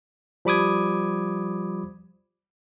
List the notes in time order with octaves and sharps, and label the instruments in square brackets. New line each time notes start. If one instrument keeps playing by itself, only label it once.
[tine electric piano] F3 G3 B5 D6 D#6 G#6